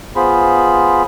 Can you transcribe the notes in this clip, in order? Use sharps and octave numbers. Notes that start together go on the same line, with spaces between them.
B3 F4 G#4 C5 B5